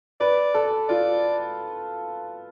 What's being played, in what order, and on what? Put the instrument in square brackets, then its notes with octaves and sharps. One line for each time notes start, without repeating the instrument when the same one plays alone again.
[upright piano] B4 [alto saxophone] D5
[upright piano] A4
[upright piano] F4 [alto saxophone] D5